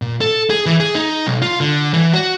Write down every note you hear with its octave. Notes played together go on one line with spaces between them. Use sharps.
A#2
A4
G#4
E3
G#4
D#4
B1
F4
D3
E3
F#4